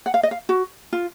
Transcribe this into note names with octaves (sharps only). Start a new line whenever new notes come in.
F#5
F5
D#5
F5
F#4
F4